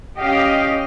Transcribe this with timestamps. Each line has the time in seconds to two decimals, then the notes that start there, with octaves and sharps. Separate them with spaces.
0.17 C#4 G4 D#5 F5